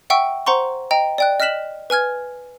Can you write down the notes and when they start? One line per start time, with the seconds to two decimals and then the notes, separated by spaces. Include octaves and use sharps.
0.10 E5 F#5 G5 C#6 E6
0.46 C5 F#5 A#5 C6 C#6
0.91 D#5 G5 A#5
1.18 D5 G5 F#6
1.40 D#5 F6 F#6 B6 E7 F#7
1.90 B4 G#5 F6 G#6